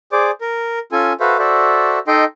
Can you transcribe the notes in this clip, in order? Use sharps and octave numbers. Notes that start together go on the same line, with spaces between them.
G#4 C5 D5 D6
A#4
C#4 F4 A4 G#5
F#4 A4 B4 C5 E5 F5
F#4 A4 C5 D5 E5
D#4 A4 D#5 G5 C6